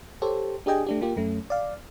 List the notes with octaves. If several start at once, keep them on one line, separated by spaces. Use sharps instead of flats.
G4 A4 C5 C#5
D4 G4 G#4 D#5 G5 G#5
A3 D4 G4
A#3 F4 G4
F#2 A3 C#4
D5 F5